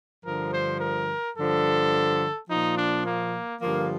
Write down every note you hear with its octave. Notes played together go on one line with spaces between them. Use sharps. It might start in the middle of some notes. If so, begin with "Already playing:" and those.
G2 D3 F3 A#4
C5
A#4
G2 D3 F3 A4
A#2 F3 D#4
D4
A#3
G2 D3 F3 A#3